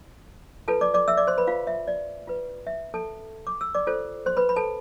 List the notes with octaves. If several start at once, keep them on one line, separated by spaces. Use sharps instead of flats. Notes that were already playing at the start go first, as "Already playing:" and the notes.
F4 A4 B4 A5
D5 D6
D5 D6
E5 E6
D5 D6
C5 C6
B4 B5
F4 F5
E5
D5
F4 B4
E5
A4 A5
D6
E6
D5 D6
F4 A4 C5
C5 C6
B4 B5
B5
A4 A5